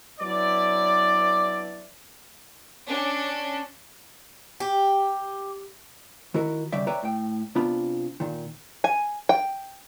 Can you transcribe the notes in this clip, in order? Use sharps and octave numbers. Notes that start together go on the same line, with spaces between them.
F#3 B3 D4 E4 B4 D5
C#4 D4
G4
D#3 E4 F#4 A#4
D#2 C#3 G3 D5 E5
B4 C#5 D5 E5 G5 A#5
A2 G5
C3 B3 D4 F4 B5
A#2 D#3
G#5
G5